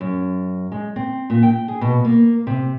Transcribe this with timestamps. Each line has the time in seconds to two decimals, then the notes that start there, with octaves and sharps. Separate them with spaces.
0.01 F#2
0.72 G#3
0.96 C4
1.30 A#2
1.43 G5
1.68 G#4
1.81 B2
2.05 A#3
2.47 C3